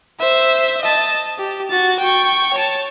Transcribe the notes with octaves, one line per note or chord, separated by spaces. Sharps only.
C5 E5
D#5 A5
G4
F#4 A6
G5 C#6
C#5 A5